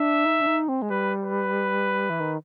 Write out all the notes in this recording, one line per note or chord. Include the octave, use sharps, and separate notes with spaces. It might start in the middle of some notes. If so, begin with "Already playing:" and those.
Already playing: D4 E5
D#4
D4
D#4
C4
G#3
G3 B4
B4
E3
D#3